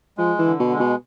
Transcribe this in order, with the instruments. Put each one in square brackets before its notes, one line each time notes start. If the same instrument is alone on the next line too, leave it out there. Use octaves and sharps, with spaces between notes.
[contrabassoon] F3 [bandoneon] G#3
[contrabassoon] E3
[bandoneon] D3
[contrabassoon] B2
[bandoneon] G#3
[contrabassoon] B2